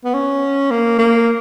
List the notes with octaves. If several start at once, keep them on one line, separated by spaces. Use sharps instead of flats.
B3
C#4
A#3
A#3